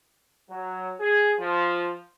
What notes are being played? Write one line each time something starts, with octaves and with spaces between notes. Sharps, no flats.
F#3
G#4
F3